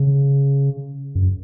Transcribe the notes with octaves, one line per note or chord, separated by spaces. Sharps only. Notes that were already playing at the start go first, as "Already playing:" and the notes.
Already playing: C#3
F#2